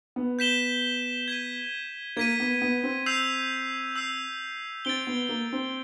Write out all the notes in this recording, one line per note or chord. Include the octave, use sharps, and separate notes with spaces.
B3
G6 B6 E7 G7
G#6 B6 D#7
A#3 G#6 B6 D#7
B3
B3
C4
E6 G6 C7 F7
E6 G6 C7 F7
C4 A6 D7 G7
B3
A#3
C4